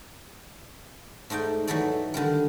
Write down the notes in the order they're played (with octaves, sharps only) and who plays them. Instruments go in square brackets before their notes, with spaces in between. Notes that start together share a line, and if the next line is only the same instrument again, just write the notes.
[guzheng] G#2 A3 D#4 D5 G5
E3 F#3 D#4 E4 A4 D5
D3 D#3 G3